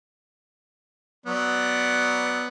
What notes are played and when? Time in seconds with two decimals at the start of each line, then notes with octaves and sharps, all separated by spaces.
1.26 F#3 B3 D5